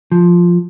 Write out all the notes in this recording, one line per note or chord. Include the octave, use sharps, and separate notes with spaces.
F3